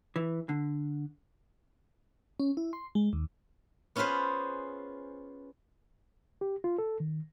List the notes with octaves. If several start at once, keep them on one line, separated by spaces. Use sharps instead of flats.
E3
D3
C#4
E4
C6
G#3
D#2
B3 C#4 F4 G#4 B4 C5
G4
F4
A4
D#3